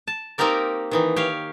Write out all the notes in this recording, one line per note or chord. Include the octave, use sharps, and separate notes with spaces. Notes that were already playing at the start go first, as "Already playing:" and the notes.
A5
A#3 C4 D#4 G4 A#4 D5
D#3 E3 D#4
G4 C#5 F5